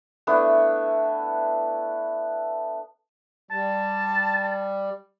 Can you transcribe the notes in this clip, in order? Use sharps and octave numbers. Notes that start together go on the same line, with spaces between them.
A3 B3 D4 E4
G3 A5